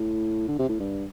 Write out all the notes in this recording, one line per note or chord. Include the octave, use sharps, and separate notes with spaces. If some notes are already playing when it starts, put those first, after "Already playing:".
Already playing: A2
D3
C3
A2
G2